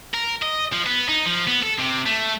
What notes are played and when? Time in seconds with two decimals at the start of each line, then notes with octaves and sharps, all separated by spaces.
0.14 A#4
0.42 D#5
0.73 F3
0.86 B3
1.09 D#4
1.25 F3
1.47 B3
1.62 A4
1.79 C3
2.06 A3